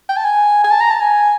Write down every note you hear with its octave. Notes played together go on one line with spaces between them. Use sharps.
G5
A5
G#5
G#5
A5
A#5
A5
G#5